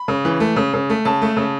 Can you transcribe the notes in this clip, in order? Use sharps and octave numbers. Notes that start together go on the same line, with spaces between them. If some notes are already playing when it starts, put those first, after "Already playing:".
Already playing: B5
C#3
E3
A3
C#3
C#3
A3
C#3 A5
A3
C#3